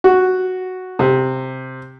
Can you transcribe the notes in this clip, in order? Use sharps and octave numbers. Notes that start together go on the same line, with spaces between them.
F#4
C3